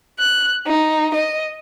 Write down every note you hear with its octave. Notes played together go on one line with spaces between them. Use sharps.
F#6
D#4
D#5